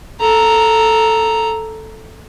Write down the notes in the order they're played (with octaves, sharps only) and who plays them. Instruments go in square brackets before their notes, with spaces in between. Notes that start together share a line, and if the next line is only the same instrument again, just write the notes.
[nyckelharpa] A4 A#5